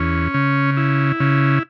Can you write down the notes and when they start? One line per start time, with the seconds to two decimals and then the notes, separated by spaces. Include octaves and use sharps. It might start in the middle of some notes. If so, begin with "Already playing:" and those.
Already playing: E2 C#4
0.34 C#3
0.77 E4
1.20 C#3